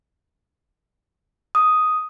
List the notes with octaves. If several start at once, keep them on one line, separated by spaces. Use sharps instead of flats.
D#6